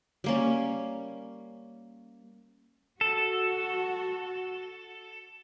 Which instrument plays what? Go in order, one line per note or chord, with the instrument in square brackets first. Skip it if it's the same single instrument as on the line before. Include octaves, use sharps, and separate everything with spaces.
[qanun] G3 A#3 C#4
[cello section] F#4 [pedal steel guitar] A4